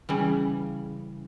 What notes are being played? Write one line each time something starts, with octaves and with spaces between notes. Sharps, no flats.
C#3 E3 G3